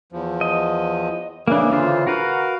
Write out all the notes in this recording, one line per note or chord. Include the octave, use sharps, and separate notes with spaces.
E2 F3
D#5
C#3 E3 A#3 D4
D3 F4 C5
F#4 A#4 B4 F5